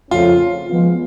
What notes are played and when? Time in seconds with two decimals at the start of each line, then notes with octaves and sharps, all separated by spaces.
0.11 F2 C#3 F3 A3 C#4 F4
0.67 F3 G#3 B3 F4